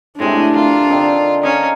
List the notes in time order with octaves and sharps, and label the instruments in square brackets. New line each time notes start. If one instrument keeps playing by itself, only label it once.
[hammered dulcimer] A2 C3 A3 [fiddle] G#3 [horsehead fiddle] D4
[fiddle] F4 [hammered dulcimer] A#4
[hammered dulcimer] D3 C4 D#4
[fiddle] C#4 [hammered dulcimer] D#5 F5 A#5